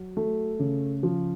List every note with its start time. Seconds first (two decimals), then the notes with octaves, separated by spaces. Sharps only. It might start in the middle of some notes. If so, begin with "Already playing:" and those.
Already playing: F#3
0.17 A3
0.60 C#3
1.03 F3